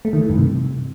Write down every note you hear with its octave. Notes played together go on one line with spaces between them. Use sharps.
A3
D#3
E3
G2
C3